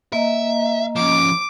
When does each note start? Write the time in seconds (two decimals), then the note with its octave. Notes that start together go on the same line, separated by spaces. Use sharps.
0.13 A#3 D#5 E5 A#5
0.96 F3 C#4 D6